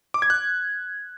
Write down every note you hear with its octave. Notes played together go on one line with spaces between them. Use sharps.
D6
G#6
F#6